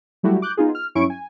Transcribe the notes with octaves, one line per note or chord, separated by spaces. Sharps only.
F#3 G3 A3 E4 F#4 G4
D6 F#6 G6
B3 D#4 F4 G#4
F6
G2 F#3 C#4 E4 C#6 D7
G#5